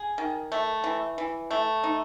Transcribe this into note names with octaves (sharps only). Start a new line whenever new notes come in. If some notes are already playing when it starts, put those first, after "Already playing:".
Already playing: G#4
D#3
A3
E3
E3
A3
D#4